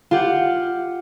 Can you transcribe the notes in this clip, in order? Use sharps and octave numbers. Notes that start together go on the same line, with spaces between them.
F4 G4 F#5